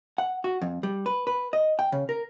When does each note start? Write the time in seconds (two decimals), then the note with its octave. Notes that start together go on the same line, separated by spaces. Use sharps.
0.18 F#5
0.44 F#4
0.62 F2
0.83 G3
1.06 B4
1.27 B4
1.53 D#5
1.79 G5
1.92 C#3
2.09 A#4